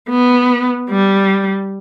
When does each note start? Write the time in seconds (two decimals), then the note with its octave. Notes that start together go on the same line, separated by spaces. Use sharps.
0.09 B3
0.90 G3